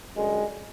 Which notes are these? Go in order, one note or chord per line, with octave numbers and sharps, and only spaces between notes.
F#2 D3 G3 G#3